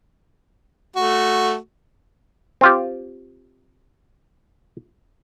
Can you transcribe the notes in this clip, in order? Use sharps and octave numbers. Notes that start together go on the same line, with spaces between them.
A3 F#4
C4 F4 G4